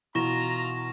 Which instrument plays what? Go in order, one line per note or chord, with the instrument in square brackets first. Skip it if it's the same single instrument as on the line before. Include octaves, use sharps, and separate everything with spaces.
[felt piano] B2 E3 [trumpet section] F4 A#5 [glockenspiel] C#6 A#6 E7